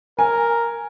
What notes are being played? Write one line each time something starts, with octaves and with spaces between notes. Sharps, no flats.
A#4 G#5